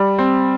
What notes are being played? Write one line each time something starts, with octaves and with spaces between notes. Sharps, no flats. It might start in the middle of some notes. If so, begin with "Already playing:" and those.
Already playing: G3
C4